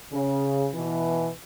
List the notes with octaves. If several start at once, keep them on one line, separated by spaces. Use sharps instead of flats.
C#3
B2 E3